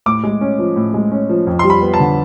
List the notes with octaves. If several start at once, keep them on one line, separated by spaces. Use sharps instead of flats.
A2 D6
G#3
C#4
F3
A2
G#3
C#4
F3
F2
G3 C6
B5
B3
A5
D3